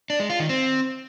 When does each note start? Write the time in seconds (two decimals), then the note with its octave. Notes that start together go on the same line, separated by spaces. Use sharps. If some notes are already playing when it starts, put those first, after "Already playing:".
0.10 D4
0.20 G#3
0.30 F4
0.39 D#3
0.49 C4